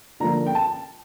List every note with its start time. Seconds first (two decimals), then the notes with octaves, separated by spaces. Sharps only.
0.20 D3 F3 A#3 A#5
0.47 G5
0.55 A5